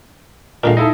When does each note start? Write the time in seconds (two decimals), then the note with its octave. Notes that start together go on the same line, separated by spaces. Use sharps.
0.64 A#2 D3 G#3 A#4 F5
0.77 D#4 E4 A4